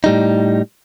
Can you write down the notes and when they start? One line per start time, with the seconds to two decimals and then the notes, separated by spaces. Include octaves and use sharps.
0.04 A2 G3 D#4